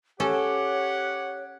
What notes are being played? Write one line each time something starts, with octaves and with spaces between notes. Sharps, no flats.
C#4 G4 A4 C#5 F#5